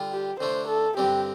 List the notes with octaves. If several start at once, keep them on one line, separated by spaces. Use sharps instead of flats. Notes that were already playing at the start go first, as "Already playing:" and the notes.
Already playing: D3 G3 F4
G4
D3 A3 D4 C5
A4
G2 D3 G3 C4 G4